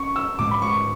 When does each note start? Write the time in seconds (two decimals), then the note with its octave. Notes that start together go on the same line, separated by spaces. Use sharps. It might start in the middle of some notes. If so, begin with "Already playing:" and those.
Already playing: C#4 C#6
0.16 E6
0.39 G#2 G#3 C#4 D6
0.51 B5
0.62 C#6